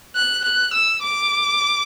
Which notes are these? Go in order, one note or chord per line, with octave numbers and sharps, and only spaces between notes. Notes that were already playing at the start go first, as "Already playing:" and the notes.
F#6
F#6
E6
D6